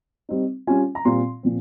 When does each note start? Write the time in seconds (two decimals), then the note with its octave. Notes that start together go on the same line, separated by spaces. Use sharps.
0.29 G3 C4 D#4
0.67 G3 C#4 F4 G#5
0.95 A#5
1.05 A#2 G3 C4 F4 C6
1.43 A#2 F3 C4